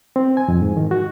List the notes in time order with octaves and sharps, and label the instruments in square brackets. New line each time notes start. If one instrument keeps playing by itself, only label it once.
[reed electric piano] C4
G#5
F2
G#2
D#3
F#4